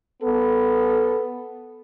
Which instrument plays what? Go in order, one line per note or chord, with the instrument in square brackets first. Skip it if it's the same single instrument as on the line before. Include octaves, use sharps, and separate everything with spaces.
[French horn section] B3 A4